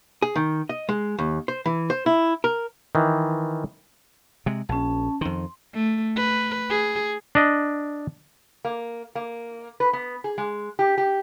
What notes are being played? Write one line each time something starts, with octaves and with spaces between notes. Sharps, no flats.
G#4
D#3
D#5
G#3
D#2
C5
E3
C5
E4
A#4
D#3 E3
C3 G#3
A#1 C#4 A5
F2 D#3 C6
A3
B4
G#4
D4 D#5
A#3
A#3
B4
B3
G#4
G#3
G4
G4